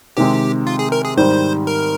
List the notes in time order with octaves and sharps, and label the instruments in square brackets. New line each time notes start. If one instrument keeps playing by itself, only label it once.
[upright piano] C3 D#3 G#3 C4 [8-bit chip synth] G4
[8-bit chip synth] F4
G#4
A#4
G#4
[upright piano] G#2 D#3 G3 [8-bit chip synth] C5
[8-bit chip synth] A#4